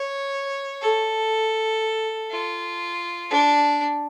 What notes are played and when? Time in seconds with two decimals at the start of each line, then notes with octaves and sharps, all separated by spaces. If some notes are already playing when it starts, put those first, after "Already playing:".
Already playing: C#5
0.81 A4
2.31 F4
3.31 D4